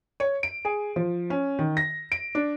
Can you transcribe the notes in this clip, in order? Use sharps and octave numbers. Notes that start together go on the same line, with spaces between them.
C#5
D7
G#4
F3
C#4
D#3
A#6
D7
D4